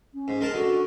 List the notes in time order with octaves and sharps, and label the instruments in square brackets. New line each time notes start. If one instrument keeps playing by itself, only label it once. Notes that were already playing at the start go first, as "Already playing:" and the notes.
[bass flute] C#4
[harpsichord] G#2
G#3 A#4 A5
[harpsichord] D3 [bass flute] F#4